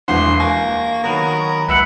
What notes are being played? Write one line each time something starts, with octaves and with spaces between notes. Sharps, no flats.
E1 E3 D4 F#5 C6
A#3 G#5 C#6
D#3 F#3 B3 A#4
C#2 B4 E5 F#5